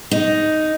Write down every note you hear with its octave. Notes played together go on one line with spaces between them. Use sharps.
D#4